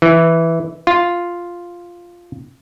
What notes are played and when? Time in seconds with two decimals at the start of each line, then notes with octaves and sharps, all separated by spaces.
0.02 E3
0.87 F4